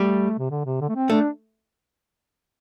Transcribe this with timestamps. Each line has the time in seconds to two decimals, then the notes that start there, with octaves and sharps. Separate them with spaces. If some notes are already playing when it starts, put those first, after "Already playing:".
Already playing: G3 A3
0.38 C3
0.50 D3
0.65 C3
0.81 D3
0.89 A3
0.96 C4
1.10 A3 D4